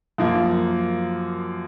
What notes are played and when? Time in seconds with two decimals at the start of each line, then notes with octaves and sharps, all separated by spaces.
0.18 F#2 F3 A#3